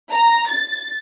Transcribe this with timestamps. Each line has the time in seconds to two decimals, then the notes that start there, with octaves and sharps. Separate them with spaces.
0.11 A#5
0.48 A6